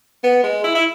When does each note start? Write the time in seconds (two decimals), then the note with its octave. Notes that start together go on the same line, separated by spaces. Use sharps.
0.24 B3
0.44 G#3
0.64 E4
0.75 E4